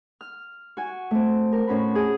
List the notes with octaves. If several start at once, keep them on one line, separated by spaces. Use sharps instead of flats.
F6
F#4 G#5
A3 C4
A#4
A2 C#4 F#4 B5
G#4